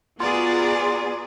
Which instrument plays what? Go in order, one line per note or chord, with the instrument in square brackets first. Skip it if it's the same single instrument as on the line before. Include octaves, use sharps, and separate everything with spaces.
[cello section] B3 G#4 [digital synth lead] F4 [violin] F#4 A#4 [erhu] D5